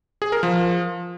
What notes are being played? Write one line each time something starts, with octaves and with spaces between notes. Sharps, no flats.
G#4
A#4
F3